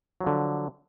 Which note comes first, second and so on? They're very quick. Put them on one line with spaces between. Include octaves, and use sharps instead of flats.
F#3 F3 D3